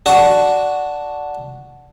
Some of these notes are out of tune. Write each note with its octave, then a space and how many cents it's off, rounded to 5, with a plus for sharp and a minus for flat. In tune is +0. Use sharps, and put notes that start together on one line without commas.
D4 -5 F#4 +0